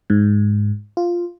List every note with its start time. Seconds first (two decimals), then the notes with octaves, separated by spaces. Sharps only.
0.10 G#2
0.97 F4